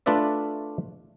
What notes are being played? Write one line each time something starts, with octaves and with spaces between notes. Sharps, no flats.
A3 D4 F4 B4 D5 E5